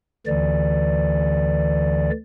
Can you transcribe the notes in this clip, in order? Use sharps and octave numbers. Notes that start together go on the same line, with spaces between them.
D2 D3 E3 D5